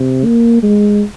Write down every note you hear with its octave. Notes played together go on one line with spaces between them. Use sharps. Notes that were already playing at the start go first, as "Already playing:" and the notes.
Already playing: C3
A#3
G#3